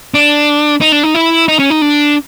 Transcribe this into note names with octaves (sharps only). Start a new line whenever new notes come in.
D4
D#4
D4
D#4
E4
D#4
C#4
D#4
D4